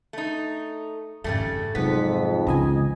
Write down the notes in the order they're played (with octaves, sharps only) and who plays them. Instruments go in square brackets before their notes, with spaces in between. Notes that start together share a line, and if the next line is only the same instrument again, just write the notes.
[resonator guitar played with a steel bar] A3 D#4
[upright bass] G#1 F2 [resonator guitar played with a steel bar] C#3 G3 A3
[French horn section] F2 G#2 [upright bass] C3 F#3 [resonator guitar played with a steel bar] B3 [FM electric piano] B6
[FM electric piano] C#2 D#5 G#5 [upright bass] D3 E3